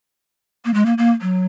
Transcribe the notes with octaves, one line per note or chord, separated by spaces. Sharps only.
A#3
G#3
A#3
A#3
F#3